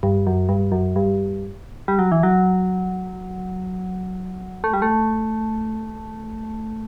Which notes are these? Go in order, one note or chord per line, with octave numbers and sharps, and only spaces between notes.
G2
F#2
G2
F#2
G2
G3
F#3
E3
F#3
A3
G3
A3